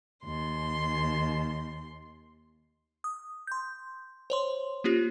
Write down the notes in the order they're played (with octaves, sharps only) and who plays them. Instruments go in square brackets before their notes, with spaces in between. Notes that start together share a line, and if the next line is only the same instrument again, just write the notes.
[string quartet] D#2 C6
[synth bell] D#6
C6 G6
C5 C#5 C6
A#3 C#4 F4 G4